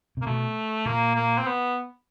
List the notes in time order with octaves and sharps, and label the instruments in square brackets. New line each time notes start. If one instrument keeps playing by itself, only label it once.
[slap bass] C3
[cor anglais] A#3
[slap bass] B2 [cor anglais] A3
[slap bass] A#2 [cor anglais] A#3
[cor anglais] A#3
C4
B3